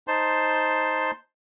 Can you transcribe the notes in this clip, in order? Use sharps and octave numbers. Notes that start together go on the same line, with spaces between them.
D#4 C5 A5 C6